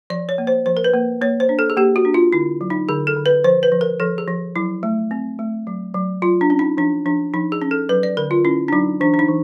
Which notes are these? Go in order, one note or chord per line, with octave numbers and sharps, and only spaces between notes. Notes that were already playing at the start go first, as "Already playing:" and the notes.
F3 D5
C#5
A#3
C5
F3 C5
A#4
B4
A#3
A#3 C#5
C5
D4
A4
G#4
A#3 G4
F#4
D4
F4
D3 E4
F#3
D#4
D3 G#4
A4
D3
B4
F3 C5
B4
F3
A#4
F3 A4
G#4
F3
F#3 E4
A3
C4
A3
F#3
F#3
F#3 F4
D4
C#4
D#4
F3 D4
F3 D4
F3 D#4
G#4
C#4
A4
F#3 B4
D5
D3 A#4
F4
C#4 E4
D4
F#3 D#4
E3 D4
D4
D#4
E3